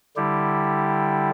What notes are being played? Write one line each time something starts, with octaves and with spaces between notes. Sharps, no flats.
D3 G3 E4 G4